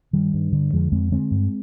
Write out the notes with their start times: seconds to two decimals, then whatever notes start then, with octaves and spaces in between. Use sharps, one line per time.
0.13 G2 D#3 G3
0.34 G2
0.52 D3
0.73 F2 F3 G#3
0.92 F2 G#3 C4
1.12 D3 G#3 C4
1.31 G2